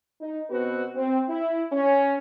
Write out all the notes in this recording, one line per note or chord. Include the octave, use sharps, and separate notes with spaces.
D#4
B2 B3 C4 F#4 B4
C4
E4
C#4